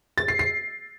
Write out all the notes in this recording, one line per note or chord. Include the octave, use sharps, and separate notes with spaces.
A6
C7
C7